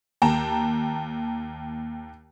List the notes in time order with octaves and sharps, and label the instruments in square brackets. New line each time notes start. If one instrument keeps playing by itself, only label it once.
[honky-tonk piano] D#2 G5 A5 A#5